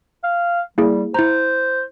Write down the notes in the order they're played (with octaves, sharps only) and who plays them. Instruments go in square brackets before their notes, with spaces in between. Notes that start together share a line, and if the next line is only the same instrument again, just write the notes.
[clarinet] F5
[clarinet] G3 [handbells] A#3 E4 G#4
[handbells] E4 A#5 [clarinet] C5